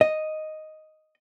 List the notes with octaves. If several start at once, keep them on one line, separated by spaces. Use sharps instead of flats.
D#5